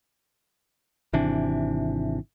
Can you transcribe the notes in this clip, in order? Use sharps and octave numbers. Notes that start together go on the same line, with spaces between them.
G#1 C3 E3 D4